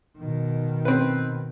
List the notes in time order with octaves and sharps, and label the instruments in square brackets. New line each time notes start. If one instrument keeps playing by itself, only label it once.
[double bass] B2 D#3
[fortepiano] C4 B4